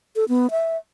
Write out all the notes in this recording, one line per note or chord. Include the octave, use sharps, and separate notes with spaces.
A4
B3
E5